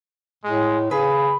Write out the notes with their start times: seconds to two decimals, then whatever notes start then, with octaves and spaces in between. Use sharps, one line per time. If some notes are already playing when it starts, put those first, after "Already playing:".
0.44 A2 G#3
0.91 C#3 G#4 B4